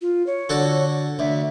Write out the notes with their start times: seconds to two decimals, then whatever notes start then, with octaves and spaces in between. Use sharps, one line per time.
0.02 F4
0.26 C#5
0.49 D3 F#4 A4
1.19 D2 E5